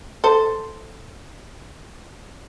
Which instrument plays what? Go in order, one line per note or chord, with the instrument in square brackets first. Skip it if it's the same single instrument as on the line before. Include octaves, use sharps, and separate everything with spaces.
[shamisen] A4 C5